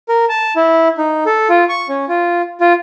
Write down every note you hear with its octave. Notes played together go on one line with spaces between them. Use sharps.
A#4
A5
E4
D#4
A4
F4
C#6
C#4
F4
F4